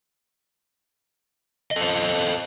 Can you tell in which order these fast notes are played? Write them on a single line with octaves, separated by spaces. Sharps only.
D#5 A4 C5